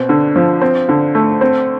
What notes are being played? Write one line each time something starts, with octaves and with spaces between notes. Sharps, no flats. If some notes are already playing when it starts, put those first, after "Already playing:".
Already playing: B2 C4
D3
F3
C4
D3
A3
C4